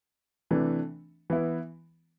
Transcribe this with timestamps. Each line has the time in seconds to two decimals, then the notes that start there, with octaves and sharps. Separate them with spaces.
0.51 C3 E3 A3 D4
1.30 E3 B3 E4